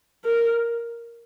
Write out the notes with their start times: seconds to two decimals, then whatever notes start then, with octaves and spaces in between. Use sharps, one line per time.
0.25 A#4